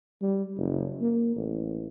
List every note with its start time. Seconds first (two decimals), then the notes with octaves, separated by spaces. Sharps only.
0.22 G3
0.58 F#1
1.01 A#3
1.36 A1